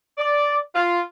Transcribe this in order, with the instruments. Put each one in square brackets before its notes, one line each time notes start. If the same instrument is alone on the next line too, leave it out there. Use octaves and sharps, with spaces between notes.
[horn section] D5
F4